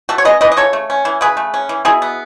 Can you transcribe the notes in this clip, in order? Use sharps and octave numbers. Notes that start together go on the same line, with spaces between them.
A3 F#4 A4
C#5
C#4 B4 D#5
E3 B4 D#5
D#5
C#3 A4 C#5
A3
C#4
E3
C#3 G#4 B4
A3
C#4
E3
B2 E4 G#4
B3